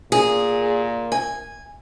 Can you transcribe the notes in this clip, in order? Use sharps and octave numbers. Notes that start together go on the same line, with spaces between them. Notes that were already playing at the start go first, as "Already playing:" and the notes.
A#2 G#4
G#5